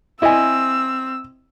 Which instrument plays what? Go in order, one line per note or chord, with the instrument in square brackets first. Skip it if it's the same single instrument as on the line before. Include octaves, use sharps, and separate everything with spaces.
[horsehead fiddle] C4 [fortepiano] E4 D#5 [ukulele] D5 G#5 [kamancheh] E6